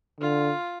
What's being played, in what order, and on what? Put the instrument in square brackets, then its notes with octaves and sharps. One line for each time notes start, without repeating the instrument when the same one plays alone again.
[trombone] D3 [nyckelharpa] F4